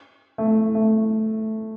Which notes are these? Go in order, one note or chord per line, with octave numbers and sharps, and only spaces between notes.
A3
A3